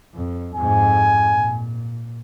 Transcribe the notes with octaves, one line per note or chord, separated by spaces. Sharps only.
F2
F2 G#2 G#5
A#2